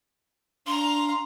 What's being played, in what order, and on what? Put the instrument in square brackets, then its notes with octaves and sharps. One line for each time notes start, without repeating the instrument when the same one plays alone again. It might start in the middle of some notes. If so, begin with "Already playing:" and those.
[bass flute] D4 [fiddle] F5 A#5 [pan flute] C6